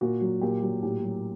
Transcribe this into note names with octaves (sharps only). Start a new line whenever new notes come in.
A#2 F#4
F#3
A#2 G4
F#3
A2 G4
F#3